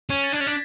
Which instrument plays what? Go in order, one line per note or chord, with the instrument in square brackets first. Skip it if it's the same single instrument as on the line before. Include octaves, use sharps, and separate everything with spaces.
[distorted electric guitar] C#4 [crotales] G#6
[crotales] A6
[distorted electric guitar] D4
[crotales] G#6
[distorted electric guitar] C#4
[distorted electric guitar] D4 [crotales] B6